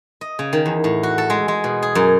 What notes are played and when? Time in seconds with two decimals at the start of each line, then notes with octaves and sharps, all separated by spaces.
0.21 D#5
0.39 C#3
0.53 D#3
0.66 E2
0.84 A2
1.03 F#4
1.18 A4
1.30 G#3
1.48 G#3
1.64 B2
1.82 G#4
1.95 F#2